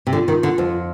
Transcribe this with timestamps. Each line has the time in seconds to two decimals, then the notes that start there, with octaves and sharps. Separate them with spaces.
0.07 C3
0.12 D3 F4
0.28 D#3
0.43 D3
0.58 F2